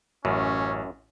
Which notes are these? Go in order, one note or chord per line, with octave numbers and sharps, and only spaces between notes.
A1 F#2 C#4